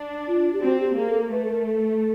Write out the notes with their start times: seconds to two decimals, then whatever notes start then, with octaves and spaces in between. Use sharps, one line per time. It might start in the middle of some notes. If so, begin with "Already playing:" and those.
Already playing: D4
0.28 F4
0.53 G4
0.62 C4 F#4
0.80 G4
0.97 A#3 G#4
1.09 A4
1.31 A3 B4
1.45 A4
1.49 A#4
1.67 A4